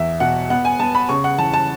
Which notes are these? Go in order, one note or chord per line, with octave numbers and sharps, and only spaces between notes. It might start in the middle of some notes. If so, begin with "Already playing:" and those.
Already playing: E2 E5
B2 F#5
B3 F#5
G#5
B3 A5
B5
C#3 C#6
F#5
E3 A5
A5